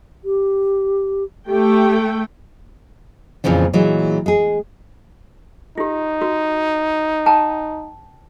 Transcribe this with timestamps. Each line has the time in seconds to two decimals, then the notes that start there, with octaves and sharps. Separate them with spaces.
0.25 G4
1.48 A3 G4 G5
3.44 F2 A#2 C#3 E3 F3
3.73 A#2 E3 F#3 G#3
4.26 G#3 G#4
5.78 D#4 F4 G4
6.21 F#4
7.26 G5 A5 A#5